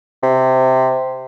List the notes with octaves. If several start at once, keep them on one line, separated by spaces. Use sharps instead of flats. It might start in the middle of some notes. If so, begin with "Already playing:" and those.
C3